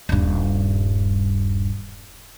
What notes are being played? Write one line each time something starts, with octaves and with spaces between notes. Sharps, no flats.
D#1 G2